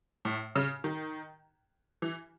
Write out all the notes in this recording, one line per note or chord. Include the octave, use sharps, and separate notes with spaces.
A2
C#3
D#3
E3